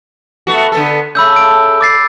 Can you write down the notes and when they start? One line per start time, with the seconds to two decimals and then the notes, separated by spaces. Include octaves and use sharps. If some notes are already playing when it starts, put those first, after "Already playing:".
0.47 A3 B3 F#4
0.72 D3 B3 A4
1.15 C#3 A3 B5 E6 G6
1.36 D7
1.81 D6 A6 C7